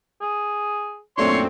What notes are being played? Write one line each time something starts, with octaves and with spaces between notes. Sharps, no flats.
G#4
F#2 A#2 A3 C4 D4 C#5 C6 C#6